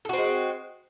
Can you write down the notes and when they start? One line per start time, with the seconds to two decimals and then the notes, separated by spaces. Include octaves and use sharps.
0.05 A4
0.09 F#4
0.13 C4
0.18 G#3